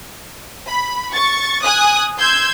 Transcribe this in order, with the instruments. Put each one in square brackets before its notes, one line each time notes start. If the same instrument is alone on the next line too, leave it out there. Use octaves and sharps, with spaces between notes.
[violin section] B5
C#6 A6
G#5 D#6 F#6
C6 E6 G6 G#6